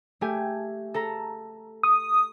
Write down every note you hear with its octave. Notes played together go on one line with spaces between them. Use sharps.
A3 G4 G#5
A4 A5 A#5
C#6 D#6